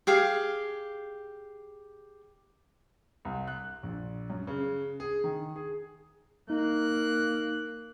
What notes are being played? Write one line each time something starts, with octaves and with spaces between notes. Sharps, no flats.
G4 G#4 F5
C2
F#6
A#1
F#2
C#3
G#4
D#3
G#4
A#3 D#4 F#6